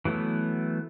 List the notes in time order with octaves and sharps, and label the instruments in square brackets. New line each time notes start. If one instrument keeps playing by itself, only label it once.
[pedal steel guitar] E3 F#3 A3 B3